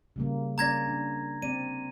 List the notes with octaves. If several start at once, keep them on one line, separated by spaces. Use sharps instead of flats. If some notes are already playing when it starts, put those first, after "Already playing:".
C#3 G3 A#3
A#3 C#4 D5 A#5 G#6 A#6
D4
C4 D5 D#7